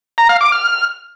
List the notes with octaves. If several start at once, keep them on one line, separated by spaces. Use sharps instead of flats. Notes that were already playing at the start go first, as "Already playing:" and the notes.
A#5
F5
D6
F6